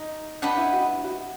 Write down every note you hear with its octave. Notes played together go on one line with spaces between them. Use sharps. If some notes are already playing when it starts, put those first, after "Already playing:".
Already playing: D#4
D4 G4 B4 D#5 F#5
E4
F#4
F#4